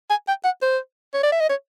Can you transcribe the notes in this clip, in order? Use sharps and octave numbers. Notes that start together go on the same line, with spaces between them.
G#5
G5
F#5
C5
C#5
D5
E5
D#5
C#5